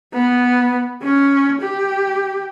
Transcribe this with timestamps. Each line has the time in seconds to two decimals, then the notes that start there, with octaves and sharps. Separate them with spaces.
0.14 B3
1.03 C#4
1.62 G4